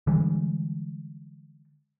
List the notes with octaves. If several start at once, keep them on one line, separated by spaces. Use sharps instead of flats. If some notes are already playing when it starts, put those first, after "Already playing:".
D3 E3 G3 G#3